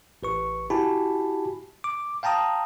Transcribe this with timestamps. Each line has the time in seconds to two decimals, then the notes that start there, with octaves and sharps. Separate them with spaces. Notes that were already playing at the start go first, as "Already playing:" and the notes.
0.23 A1 B4 C#6
0.70 E4 F#4 G4 G#5 A5 B5
1.84 D6
2.23 F5 G5 A5 A#5 D#6